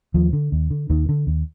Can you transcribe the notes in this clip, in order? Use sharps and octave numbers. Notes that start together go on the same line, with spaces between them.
D#2 F3
D3
D#2
D3
D#2 D#3
D3
D#2